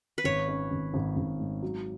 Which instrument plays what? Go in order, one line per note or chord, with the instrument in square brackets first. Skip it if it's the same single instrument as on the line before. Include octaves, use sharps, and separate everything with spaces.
[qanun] B4
[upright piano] G#1 [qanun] C#5
[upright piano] C#4
G#1
G#1
G#1
G#2
F#3